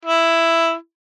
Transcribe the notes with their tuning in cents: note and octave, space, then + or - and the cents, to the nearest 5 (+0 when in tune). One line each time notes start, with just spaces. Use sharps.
E4 +5